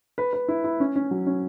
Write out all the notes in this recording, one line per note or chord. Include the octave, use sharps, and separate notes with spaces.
B4
B4
E4
E4
C#4
C#4
F#3
C#4